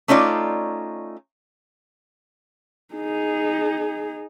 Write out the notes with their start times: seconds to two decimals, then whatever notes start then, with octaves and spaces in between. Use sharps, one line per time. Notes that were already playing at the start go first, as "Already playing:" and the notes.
0.08 A3 C#4 D#4 F4 D5
2.94 D#4 G#4